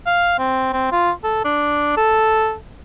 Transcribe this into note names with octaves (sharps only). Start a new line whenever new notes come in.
F5
C4
C4
F4
A4
D4
A4